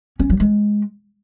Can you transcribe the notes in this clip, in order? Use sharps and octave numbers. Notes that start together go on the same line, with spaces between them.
C#4
F#3
G#3